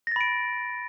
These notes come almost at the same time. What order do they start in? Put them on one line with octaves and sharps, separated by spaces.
A#6 A6 B5 D7